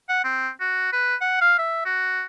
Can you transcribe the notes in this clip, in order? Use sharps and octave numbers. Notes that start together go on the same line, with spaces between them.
F#5
C4
F#4
B4
F#5
F5
E5
F#4